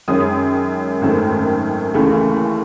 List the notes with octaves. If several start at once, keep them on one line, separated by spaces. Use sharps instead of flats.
F#2 D#3 G#3 C#4 D#6
G#1 F#2 D#3 A3
D#2 C#3 E3 A3